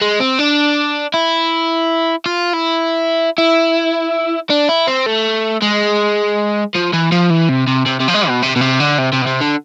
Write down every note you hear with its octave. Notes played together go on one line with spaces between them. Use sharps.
G#3
C4
D4
E4
F4
E4
E4
D4
E4
C4
A3
G#3
F3
E3
F3
E3
C3
C3
C3
C3
F3
G#3
B2
C3
B2
C3
D3
C3
C3
B2
C3
D3